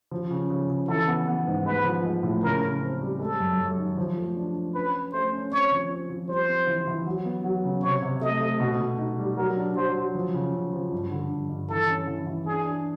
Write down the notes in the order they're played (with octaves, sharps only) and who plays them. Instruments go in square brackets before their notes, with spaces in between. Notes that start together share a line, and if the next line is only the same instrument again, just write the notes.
[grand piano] F3
C#3
C#3
C#3
[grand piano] E3 [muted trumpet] A4
[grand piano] B3
B3
G#2
[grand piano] G#3 [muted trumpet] B4
[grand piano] F3
G#3
A2
[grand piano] C#3 [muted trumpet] A#4
[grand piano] C#3
C4
G3
[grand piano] G#3 [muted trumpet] A4
[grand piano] F#2
F#2
D#3
F3
A3
D4
D4
[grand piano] C#4 [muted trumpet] B4
[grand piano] C#4
[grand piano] A3 [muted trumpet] C5
[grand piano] C#4
[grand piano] C4 [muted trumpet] C#5
[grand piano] F3
C4
F3
[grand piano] G3 [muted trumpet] C5
[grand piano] C4
E3
E3
F#3
B3
F#3
C#3
[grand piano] C3 [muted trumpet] C#5
[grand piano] C3
[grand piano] A3 [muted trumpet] D#5
[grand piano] A3
B2
B2
D#4
G3
[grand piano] F#3 [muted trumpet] A#4
[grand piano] D4
[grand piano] F#3 [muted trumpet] C5
[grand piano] F#3
F3
C#3
C#3
F3
G2
D3
G2
G2
[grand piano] E3 [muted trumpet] A4
[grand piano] C#4
E3
E3
[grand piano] D4 [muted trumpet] G#4
[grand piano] D4